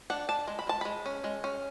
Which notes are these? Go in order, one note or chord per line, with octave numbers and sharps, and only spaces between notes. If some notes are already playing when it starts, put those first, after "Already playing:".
D4 F#5
D4 A5
G#3
B5
G#3 A5
G#3 B5
C#4
G#3
C#4